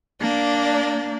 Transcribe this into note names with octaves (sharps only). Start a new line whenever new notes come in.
A#3 D4 D5